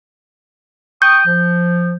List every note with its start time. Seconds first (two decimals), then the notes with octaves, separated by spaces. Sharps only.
1.02 G5 C#6 D#6 G6
1.27 F3